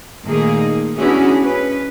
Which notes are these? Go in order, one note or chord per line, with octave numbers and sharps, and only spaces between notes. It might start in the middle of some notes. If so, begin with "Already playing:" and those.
A#2 D#3 A3 A#3 D#4 G#4
B3 C#4 D4 E4 F#4 G#4
C#4 B4